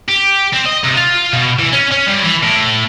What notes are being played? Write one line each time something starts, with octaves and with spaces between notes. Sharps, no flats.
G4
C4
D#5
C3
F4
B2
E3
C#4
C#4
G2
E3
A2